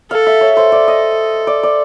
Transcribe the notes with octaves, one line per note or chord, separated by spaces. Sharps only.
A4 F5
E5
C#5
A4 C5
D5
D#5
D5
D5